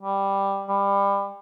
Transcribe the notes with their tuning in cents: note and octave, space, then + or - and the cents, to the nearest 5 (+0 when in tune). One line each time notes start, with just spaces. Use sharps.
G3 +5
G3 +25